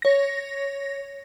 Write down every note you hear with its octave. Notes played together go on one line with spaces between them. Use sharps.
C#5 A#6